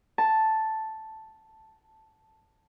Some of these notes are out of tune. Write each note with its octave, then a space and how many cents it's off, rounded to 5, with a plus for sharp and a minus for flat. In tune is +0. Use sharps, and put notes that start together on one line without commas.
A5 +0